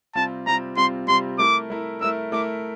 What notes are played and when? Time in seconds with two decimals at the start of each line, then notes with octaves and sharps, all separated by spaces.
0.15 C3 G3 C4 F4 A5
0.46 C3 G3 C4 F4 A#5
0.77 C3 G3 C4 F4 C6
1.08 C3 G3 C4 F4 C6
1.39 A3 E4 A#4 D6
1.70 A3 E4 A#4
2.01 A3 E4 A#4 E6
2.32 A3 E4 A#4 D6